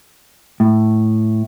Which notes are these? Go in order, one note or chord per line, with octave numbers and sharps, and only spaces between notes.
A2